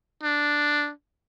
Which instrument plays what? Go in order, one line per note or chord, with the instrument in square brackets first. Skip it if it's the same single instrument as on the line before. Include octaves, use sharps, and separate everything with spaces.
[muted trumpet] D4